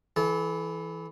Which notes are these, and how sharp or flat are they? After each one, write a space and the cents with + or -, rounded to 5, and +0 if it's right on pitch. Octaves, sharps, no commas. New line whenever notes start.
E3 +5 A4 -35